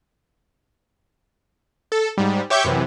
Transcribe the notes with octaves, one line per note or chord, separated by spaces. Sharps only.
A4
G#2 G3
G4 C#5 E5 C#6 D6 G6
F#2 C3 E3